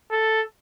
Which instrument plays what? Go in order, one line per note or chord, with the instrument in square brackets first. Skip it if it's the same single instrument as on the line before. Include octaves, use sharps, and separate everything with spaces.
[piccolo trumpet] A4